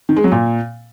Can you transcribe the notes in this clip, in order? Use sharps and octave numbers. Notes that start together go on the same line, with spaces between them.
D#3
G#3
F#3
A#2